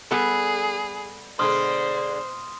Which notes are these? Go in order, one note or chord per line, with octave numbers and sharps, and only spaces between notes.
G3 B3 G#4 A4
B2 D3 G#3 C5 C6 D#6 F6